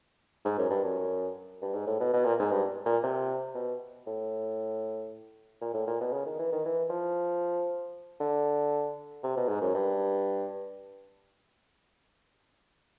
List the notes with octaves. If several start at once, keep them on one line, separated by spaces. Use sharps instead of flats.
G#2
F#2
G2
F#2
G2
G#2
A2
B2
B2
A#2
G#2
G2
A#2
C3
B2
A2
A#2
A2
A#2
B2
C#3
D#3
E3
D#3
E3
F3
D3
C3
B2
G#2
F#2
G2